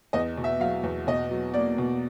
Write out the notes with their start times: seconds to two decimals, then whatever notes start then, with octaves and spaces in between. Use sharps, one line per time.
0.13 E2 D#5
0.37 B2
0.44 E5
0.60 F#3 F5
0.83 E2
1.07 B2 D#5
1.31 F#3
1.54 A#3 D5
1.78 B2